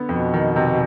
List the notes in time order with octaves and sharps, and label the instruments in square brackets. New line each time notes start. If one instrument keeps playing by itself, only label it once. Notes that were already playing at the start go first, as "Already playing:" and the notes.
Already playing: [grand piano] D3 B3
[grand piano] F2 [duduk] B2
[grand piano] D#3
C3